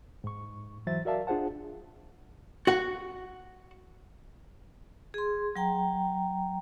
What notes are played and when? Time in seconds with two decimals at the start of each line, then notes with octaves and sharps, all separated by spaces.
0.24 G#2 C#6
0.87 E3 F#3 C5 E5 A6
1.05 F#4 A#4 D5 E5 F5 A5
1.27 D4 F4 G#4 C5 F#5 A5
2.67 F#4 F#5
5.14 G#4 C6
5.56 F#3 G5 A#5